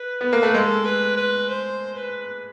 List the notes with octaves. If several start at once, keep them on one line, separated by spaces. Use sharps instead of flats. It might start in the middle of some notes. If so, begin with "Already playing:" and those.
Already playing: B4
B3
A#3
A3
G#3 A4
B4
B4
C5
B4